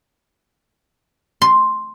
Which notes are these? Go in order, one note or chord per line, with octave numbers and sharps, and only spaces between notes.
C6